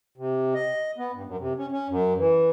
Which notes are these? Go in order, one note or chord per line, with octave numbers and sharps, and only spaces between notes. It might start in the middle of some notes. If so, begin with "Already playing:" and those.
C3
D#5
B3
G2
F#2
C3
C#4
C#4
F#2
E3